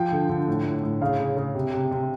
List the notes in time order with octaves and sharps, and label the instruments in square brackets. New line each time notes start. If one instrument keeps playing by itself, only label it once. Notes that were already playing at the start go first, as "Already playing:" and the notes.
Already playing: [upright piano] F3 G5
D3
D3
A2
A2
A2
C#3 F5
C#3
C#3
C3
C3
C3